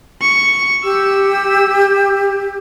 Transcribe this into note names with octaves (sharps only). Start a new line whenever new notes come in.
C#6
G4 E6